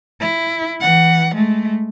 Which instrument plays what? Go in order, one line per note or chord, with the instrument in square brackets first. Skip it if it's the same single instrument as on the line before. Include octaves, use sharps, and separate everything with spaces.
[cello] E4
E3 F#5
G#3 A3